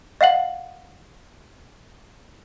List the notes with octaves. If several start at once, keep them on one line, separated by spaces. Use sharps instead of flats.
D#5 F5 F#5 F#7